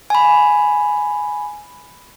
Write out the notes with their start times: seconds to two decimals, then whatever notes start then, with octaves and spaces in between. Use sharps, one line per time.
0.10 G#5 B5